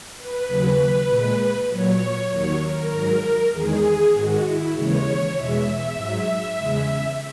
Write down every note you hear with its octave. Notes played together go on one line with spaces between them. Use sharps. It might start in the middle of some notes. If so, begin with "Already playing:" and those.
B4
D#2 C#3 F#3
A#2 G#3
A#2 F#3 C#5
D#2 D#3 F#3 C#5
A#4
G#2 F#3
E2 D#3 G#3 G#4
G#2 D#3 G#3 F#4
E4
D#2 C#3 E3 G#3 C#5
E2 B2 G#3 E5
E5
G#2 F#3
E2 C#3 G#3